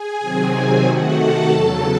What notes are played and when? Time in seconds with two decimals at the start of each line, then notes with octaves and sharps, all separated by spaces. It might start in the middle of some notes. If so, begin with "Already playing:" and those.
Already playing: G#4 G#5
0.20 C3 D#3 F#3 C4
0.85 C3 D#3 A3 F#4 F#5
1.17 A4 A5
1.50 E2 C#3 F#3